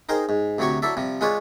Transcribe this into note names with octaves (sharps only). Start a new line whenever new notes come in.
D#4 G#4 A#4 C5 G5
G#2
D2 C3 F#3 G4 C#5 C#6
F#3 E4 A4 D5 E5
C3 F3 G3
G#3 F4 B4 C#5 D5